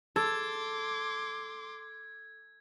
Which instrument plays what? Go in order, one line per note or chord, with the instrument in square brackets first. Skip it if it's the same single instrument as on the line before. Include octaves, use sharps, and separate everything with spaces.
[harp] A4 [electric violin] C6 D6 [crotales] G#6